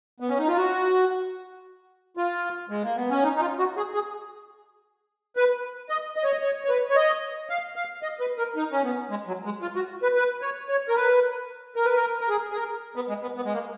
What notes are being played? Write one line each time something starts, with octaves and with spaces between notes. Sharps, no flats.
B3
C#4
D#4
F4
F#4
F4
G#3
A#3
B3
C#4
D#4
D#4
F4
F#4
G#4
G#4
B4
D#5
D#5
C#5
D#5
C#5
C#5
B4
C#5
D#5
F5
F5
D#5
B4
A#4
D#4
C#4
B3
G#3
F#3
G#3
F4
F#4
B4
B4
C#5
C#5
A#4
B4
A#4
B4
A#4
A#4
G#4
G#4
A#4
B3
G#3
B3
B3
G#3
A#3